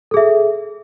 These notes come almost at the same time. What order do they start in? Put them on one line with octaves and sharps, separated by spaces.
A4 G#4 E5